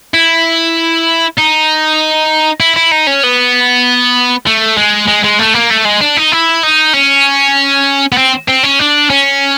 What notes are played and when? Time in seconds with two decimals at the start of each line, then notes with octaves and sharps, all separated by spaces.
0.14 E4
1.38 D#4
2.60 E4
2.76 E4
2.91 D#4
3.07 C#4
3.23 B3
4.47 A3
4.77 G#3
5.08 G#3
5.24 G#3
5.39 A3
5.54 A#3
5.70 A3
5.85 G#3
6.01 D4
6.17 D#4
6.32 E4
6.63 D#4
6.93 C#4
8.12 B3
8.17 C4
8.48 C4
8.63 C#4
8.79 D4
9.10 C#4